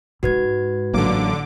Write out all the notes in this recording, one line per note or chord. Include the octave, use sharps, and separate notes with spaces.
G#2 G#3 F#4 B4 G#6
A1 D3 F#3 A#3 D6